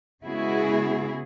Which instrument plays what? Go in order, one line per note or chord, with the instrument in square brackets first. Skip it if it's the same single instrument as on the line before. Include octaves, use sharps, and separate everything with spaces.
[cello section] C#3 G#3 B3 E4 F#4 G#4